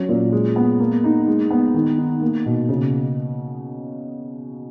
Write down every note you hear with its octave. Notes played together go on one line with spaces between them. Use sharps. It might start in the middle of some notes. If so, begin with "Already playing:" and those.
Already playing: F#3 C#4
A#2
G#3
B3
A#3
D#4
G#3
B3
D#3
D#4
A#3
B2
C#3